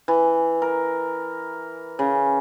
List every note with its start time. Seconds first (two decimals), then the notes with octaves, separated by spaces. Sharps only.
0.08 E3
0.62 A#4
1.99 C#3